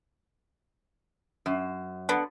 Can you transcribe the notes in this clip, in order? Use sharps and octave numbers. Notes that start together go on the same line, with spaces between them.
F#2
D3 B3